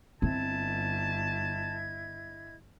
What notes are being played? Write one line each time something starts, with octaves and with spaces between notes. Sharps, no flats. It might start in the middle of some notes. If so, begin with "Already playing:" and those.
G1 C4 E4 D#5 A5 G#6